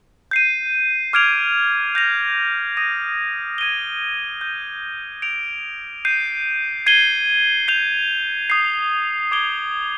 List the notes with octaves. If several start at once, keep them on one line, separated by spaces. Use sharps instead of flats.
G6 C7 D#7
D6 F6 G#6 D7 F7
G6 A#6 F7
D#6 A#6 D#7
G#6 D#7 G7
G6 A#6 D#7
G6 D7 F7
G6 C7 D#7
G#6 C7 D#7 G7
G6 C7 F7
D#6 G6 C7
D6 G#6 D7 G7